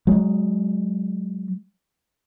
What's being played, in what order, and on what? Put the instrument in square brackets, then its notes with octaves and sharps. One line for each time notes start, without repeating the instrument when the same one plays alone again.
[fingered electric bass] F#3 G#3